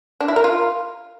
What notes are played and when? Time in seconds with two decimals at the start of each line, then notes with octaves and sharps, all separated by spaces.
0.20 D4
0.28 E4
0.36 A#4
0.44 F4